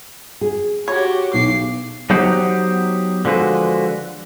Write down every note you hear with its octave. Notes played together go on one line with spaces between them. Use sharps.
G#4
F#4 G4 C#5
B1 D6 C7
F#3 B3 D#4 G4 C5 F#5
D3 F3 G#3 F#4 B4